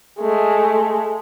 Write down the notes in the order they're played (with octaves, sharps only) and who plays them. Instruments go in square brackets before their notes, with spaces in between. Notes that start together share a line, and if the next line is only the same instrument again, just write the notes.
[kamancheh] G#3 A3